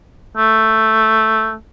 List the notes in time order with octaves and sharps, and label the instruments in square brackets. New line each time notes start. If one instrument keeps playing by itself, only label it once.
[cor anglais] A3